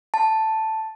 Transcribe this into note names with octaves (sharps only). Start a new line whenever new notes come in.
A5